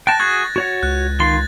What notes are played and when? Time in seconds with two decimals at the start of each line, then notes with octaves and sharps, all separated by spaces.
0.07 G5 A5 F#6 A6 A#6
0.20 F#4 G#4 C#6 F#6 G#6
0.56 F#4 C#5 F#5
0.83 C#2 F#6
1.20 D#3 F4 C6 A6